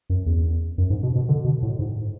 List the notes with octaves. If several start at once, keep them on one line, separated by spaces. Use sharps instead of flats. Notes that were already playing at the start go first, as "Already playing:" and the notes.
F#2
E2
F#2
G#2
B2
B2
D3
B2
A2
G#2